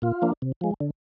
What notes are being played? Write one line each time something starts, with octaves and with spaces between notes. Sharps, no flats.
A#2 F4
F3 A#3 D4
C3
F3 G#3
D3